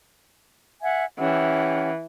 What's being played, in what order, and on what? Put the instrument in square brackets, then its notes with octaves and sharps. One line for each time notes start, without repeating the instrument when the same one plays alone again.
[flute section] E5 F#5 G#5
[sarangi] E3 [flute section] C#4 G4 F#5